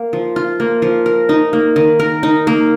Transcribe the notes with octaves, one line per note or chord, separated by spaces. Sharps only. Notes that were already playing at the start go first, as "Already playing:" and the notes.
Already playing: A#3
F3
F4
A#3
F3
A#4
D#4
A#3
D#3
A#4
D#4
A#3